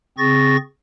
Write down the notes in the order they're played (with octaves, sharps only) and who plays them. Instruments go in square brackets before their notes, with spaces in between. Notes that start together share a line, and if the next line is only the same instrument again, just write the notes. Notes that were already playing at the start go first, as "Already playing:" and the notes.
[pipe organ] C#3 C4 G#4 C#6 A6 A#6